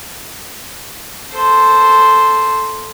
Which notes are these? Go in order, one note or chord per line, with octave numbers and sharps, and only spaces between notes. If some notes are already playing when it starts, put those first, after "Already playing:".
A4 C5